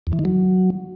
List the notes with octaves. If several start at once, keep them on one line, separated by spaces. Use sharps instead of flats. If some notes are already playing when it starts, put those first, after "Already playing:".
E2
E3
D#3
F#3